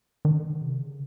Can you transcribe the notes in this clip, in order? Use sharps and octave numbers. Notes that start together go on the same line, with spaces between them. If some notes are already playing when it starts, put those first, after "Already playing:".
D#3
C3
C#3